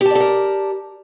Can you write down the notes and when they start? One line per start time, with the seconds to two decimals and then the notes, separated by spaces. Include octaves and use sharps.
0.01 G4
0.06 A5
0.10 D5
0.15 A4
0.20 A#4